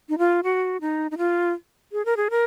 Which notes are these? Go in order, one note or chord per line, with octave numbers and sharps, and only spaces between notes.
D#4
F4
F#4
D#4
D#4
F4
G#4
A#4
G#4
A#4